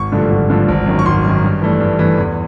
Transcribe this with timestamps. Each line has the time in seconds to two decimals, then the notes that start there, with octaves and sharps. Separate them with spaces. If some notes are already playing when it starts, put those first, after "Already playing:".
Already playing: G#1 C#6
0.12 G2 D3 F3 A3
0.30 G#1
0.50 G2 D3 F3 A3
0.68 G#1
0.87 F#2 D#3
0.99 C#6
1.06 G#1 C6
1.25 F#2 D#3
1.44 G2
1.62 E3 A3 D4
1.80 G2
1.99 E3 A3 D4
2.18 E2